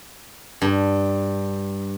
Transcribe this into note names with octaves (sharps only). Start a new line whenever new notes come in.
G2